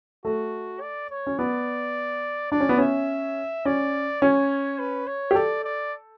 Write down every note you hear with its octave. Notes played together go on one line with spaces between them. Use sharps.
A3 F#4
D5
C#5
C#4
B3 D5
D4 D5
C#4
B3
C#4 E5
C#4 D5
C#4 C#5
B4
C#5
G4
A4 D5
D5